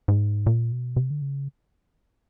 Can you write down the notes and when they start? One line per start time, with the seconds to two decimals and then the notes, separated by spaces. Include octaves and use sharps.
0.08 G#2
0.46 A#2
0.72 B2
0.96 C3
1.11 D3
1.22 C#3